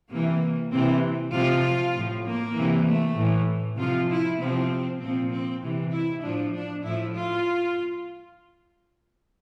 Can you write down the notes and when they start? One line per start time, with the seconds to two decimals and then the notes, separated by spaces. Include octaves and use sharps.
0.10 C3 E3 A#3
0.72 C3 E3 C4
1.33 C3 F3 F4
1.95 A2 F3
2.25 A#3
2.55 C3 E3
2.86 A3
3.16 A2 E3
3.78 C3 F3 F4
4.09 E4
4.40 C3 F3 C4
5.00 A#2 F3 C4
5.31 C4
5.61 C3 E3
5.93 E4
6.23 A2 F3 D4
6.54 D4
6.84 A2 F3 E4
7.16 F4